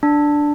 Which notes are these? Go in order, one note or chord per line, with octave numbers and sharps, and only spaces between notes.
D4